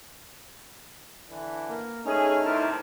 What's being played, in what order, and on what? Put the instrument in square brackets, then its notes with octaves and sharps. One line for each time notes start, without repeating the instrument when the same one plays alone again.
[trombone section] D3 E3
[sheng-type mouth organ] A#3
[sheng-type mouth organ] A3 D#4 F6 [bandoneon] C#4 [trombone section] G#4
[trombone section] D2 G2 C3 [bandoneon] E4 A#4 A5